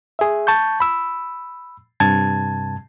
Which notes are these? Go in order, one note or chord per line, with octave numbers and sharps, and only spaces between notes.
G#4 E5
A5 C#6 G6
B5 E6
G2 C3 A5 G#6